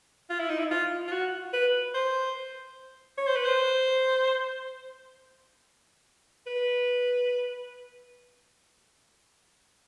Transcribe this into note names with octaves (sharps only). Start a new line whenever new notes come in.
F4
E4
D#4
E4
F4
F4
F#4
B4
C5
C#5
C5
B4
C5
B4